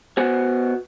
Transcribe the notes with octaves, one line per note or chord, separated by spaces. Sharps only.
B3 F#4 C5 G#5